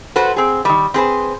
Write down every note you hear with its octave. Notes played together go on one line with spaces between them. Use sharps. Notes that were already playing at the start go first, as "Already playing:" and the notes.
F#4 A4 B4 C5
C4 G#4
D#3 G3
C4 G#4 B4 C5